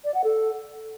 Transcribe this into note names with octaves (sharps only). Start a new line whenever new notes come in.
D5
F#5
A4